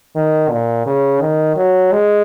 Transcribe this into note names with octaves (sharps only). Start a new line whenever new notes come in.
D#3
A#2
C#3
D#3
F#3
G#3